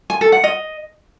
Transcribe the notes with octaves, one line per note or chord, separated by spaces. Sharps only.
G#5
A4
F#5
D#5